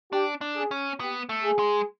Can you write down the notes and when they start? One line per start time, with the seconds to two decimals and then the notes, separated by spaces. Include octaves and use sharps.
0.12 D4 G4
0.41 D4
0.56 G#4
0.71 C#4
1.00 B3 G4
1.29 A3
1.44 G#4
1.59 G#3